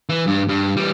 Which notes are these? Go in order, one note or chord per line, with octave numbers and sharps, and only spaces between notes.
E3
G2
G2
E3 G3